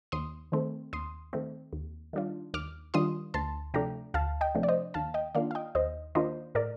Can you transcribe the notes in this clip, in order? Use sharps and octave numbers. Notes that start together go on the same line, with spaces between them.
D#2 C6 D#6
D#3 A3 C4
D#2 C6 D#6
D#3 A3 C4
D#2
D#3 G3 D4 F4
D#2 D6 F6
D#3 G3 D4 F4 C6 D#6
D2 A5 C6
C3 F3 A3 D4 G5 A#5
D2 F5 A5
D#5 G5
C3 F3 A3 D4
D5
C5 D#5
D#2 F5 A5
D#5 G5
D#3 A#3 D4 F4 D5 F5
F5
D#5 G5
D#2 C5 D#5
D#3 A#3 D4 F4 C5 D#5
A2 A#4 D5